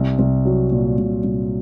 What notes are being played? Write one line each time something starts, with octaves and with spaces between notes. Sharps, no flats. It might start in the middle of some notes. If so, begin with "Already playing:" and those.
Already playing: C2
C2
F#3
A#2
C2
C2